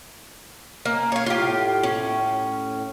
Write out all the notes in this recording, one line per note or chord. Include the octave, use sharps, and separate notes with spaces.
A#3 C#4
C#5 F5
A2 F4 G4
C#4